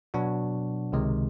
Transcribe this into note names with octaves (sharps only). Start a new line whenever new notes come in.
B2 F#3 B3 D4 F#4
C#2 C3 D#3 G#3